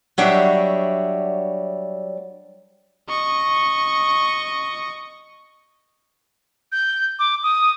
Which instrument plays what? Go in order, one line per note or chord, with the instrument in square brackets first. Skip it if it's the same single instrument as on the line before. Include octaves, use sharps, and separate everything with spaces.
[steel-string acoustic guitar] F#3 G3 D4 C#5 D#5 E5
[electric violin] D#5 C#6
[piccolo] G6
D6
D#6